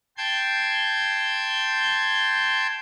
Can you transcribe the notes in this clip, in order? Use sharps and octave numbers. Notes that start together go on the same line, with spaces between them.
G5 A5 C6 G6 G#6